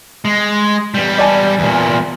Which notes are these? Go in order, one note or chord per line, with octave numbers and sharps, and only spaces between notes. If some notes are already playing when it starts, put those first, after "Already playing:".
G#3
E2 G3
D5 G#5 A5
E2 A#2